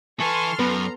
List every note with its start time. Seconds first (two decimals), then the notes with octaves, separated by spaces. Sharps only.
0.20 E3 A4 B4 G#5 A5 C6 C#6 F6
0.59 F#2 B3 B4 A#5